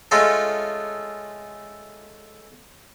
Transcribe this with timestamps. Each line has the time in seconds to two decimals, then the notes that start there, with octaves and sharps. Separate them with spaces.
0.11 G#3 A3 C#4 F4 G#4 A4